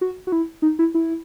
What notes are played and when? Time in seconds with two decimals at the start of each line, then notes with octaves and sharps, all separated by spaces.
0.01 F#4
0.27 F#4
0.32 E4
0.62 D#4
0.79 E4
0.94 E4